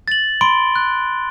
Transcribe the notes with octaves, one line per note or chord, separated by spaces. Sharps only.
A6 F#7
B5 C6 D7 G7
F#6